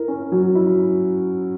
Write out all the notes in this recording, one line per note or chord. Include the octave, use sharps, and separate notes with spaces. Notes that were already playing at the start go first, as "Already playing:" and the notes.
Already playing: E4 A#4
C#4
F#3
E4